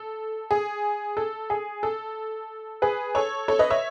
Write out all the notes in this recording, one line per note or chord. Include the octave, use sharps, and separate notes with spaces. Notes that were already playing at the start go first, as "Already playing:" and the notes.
Already playing: A4
G#4
A4
G#4
A4
G#4 B4
A4 C#5
A4 C#5
B4 D#5
C#5 E5